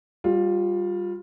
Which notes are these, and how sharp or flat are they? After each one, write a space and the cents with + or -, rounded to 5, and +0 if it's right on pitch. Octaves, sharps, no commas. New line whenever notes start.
G3 +5 F4 +20